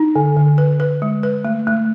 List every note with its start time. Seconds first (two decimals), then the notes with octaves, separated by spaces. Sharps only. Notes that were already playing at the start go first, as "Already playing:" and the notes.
Already playing: D#4
0.16 D3
0.37 D3
0.58 B4
0.80 B4
1.02 G#3
1.23 B4
1.45 A3
1.67 A3